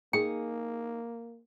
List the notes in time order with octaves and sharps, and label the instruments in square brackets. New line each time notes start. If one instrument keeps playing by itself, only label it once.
[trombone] A#3 [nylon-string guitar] D#4 G#4 [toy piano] G5